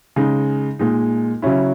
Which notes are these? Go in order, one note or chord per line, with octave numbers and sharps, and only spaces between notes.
C#3 G#3 D#4
A#2 G#3 D#4
C#3 F#3 C#4 E4